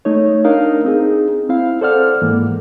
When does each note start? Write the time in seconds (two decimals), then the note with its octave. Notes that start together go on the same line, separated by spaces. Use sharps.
0.05 A3 D#4 C#5
0.45 D4 D#4 A#4 F5
0.85 C4 D#4 G#4
1.49 C4 E4 F5
1.81 A4 C5 D5 F#5 F6
2.22 G#2 E3 A#3